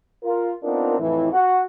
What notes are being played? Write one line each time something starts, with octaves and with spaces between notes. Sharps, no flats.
F4 A#4
B3 C4 D4 D#4 F4 A#4
F2 A2 E3 E4
F#4 F#5